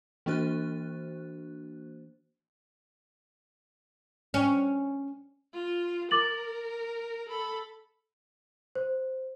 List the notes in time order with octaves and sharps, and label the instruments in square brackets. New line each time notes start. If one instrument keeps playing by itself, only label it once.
[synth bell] E3 A#3 D4 F#4 C5 F#6
[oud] C#4
[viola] F4
[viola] A#4 [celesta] D6 A6 F#7
[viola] A4 B5
[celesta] C5